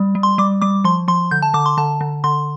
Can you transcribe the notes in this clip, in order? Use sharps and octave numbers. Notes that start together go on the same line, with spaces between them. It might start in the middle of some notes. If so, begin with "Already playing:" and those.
Already playing: G3
G3
C6
G3 D6
G3 D6
F3 C6
F3 C6
D3 G6
A5
D3 D6
C6
D3 A5
D3
D3 C6